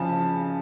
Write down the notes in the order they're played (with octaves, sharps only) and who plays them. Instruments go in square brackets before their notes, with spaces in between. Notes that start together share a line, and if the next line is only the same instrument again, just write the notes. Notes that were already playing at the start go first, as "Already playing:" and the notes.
Already playing: [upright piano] C#3 F3 A5